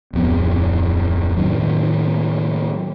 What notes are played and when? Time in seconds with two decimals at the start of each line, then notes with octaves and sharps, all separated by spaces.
0.13 D1 F2 B3
1.37 A2 D#3 F#3